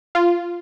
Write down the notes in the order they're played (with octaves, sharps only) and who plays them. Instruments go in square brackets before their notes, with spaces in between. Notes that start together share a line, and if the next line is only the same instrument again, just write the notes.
[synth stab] F4